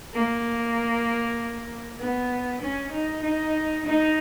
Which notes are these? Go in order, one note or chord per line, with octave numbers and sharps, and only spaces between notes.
A#3
B3
C#4
D#4
D#4
D#4